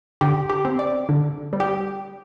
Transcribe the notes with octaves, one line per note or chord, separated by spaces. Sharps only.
D3 G4
G4
C4
D5
D3
G3
G4